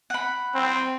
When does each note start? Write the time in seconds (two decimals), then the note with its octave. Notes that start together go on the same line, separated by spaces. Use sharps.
0.10 F#5 B5
0.55 C4